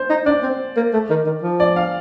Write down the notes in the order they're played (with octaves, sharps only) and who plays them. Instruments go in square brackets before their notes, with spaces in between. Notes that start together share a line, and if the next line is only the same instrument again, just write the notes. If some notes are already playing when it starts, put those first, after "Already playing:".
Already playing: [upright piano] C5
[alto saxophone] D#4
[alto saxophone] D4 [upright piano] D5
[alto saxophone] C4
A#3
A3
D#3
D#3
F3
[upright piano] D5
F5